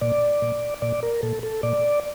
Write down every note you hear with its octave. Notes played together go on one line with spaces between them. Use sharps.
A#2 D5
A#2
A#2 D5
A#4
A#2 A4
A4
A#2 D5